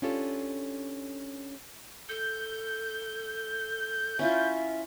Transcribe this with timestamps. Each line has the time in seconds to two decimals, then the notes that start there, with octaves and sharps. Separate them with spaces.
0.02 C#4 D4 F4 G4 A4 C#5
2.09 A4 G6
4.19 C#4 E4 F4 E5